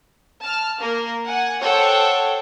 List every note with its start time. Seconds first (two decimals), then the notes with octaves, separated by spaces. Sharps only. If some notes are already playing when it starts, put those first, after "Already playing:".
0.43 A5 F6
0.80 A#3 A#4
1.26 F#5 G#5
1.61 A4 C5 C#5 F#5 G5